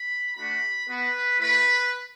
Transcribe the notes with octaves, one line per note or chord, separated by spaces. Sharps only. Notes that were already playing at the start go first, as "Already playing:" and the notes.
Already playing: B5
A3 D4 F#4 B5
B3 F#4 B4
A3 E4 B4